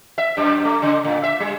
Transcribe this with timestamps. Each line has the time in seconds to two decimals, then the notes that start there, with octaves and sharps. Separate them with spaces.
0.18 E5
0.37 F#2
0.65 A3
0.82 C#3
1.04 A2
1.23 E5
1.40 G3